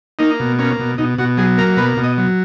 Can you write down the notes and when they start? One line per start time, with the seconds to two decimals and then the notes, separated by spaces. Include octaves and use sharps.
0.19 A#3 D#4
0.40 B2
0.59 A#3 C#4
0.79 B2
0.98 B2 D#4
1.18 B2 F#4
1.37 F#3 G#4
1.58 A#3 A#4
1.77 B2 B4
1.97 B2
2.04 D#5
2.18 F#3